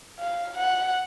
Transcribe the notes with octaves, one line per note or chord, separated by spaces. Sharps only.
F5
F#5